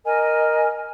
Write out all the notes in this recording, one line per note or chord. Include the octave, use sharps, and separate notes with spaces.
A#4 D#5 G#5